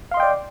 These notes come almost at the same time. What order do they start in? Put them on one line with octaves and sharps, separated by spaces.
F5 C6 D#5 G5 D5